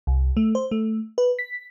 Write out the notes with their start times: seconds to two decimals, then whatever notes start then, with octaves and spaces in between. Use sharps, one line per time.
0.07 C2
0.37 A3
0.55 C5
0.71 A3
1.18 B4
1.39 B6